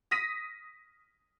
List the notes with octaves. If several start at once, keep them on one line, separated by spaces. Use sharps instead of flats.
D#6 A#6 B6 D#7